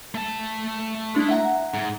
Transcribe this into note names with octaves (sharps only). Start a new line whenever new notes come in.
A3 A5
G#3 D4 E4
E5 F#5 A#5
G#2